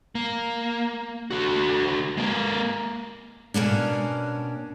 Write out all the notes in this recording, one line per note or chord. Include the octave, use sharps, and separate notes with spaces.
A#3
D3 F#4
G#3 A#3
B2 A#3 C#4 D4